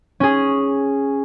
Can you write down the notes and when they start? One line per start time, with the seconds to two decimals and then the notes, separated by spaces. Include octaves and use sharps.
0.20 C#4 G#4